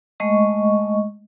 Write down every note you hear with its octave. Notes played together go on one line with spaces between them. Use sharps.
G#3 A3 D#5 C#6